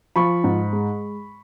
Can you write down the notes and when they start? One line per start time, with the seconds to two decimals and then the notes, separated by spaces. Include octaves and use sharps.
0.16 F3 B5 C#6
0.44 G#2
0.73 G#3